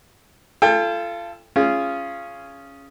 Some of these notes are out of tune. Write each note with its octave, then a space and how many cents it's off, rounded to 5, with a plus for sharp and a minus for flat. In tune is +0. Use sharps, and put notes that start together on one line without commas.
F4 -30 A4 +0 G5 +30
C#4 +0 F4 -20 G#4 +0